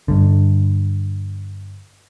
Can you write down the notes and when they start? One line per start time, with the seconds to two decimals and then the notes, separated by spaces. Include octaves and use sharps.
0.08 G2 D3